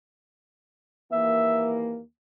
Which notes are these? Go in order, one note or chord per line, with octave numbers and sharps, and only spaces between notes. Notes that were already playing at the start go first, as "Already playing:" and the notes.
D#2 E3 A#3 E5